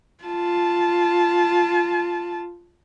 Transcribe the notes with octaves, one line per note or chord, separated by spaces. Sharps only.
F4 A5